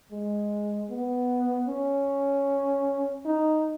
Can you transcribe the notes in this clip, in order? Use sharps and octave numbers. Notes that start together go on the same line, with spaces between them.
G#3
B3
C#4
D#4